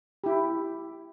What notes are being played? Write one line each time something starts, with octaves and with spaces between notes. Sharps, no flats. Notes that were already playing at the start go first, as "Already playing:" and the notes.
E4 G4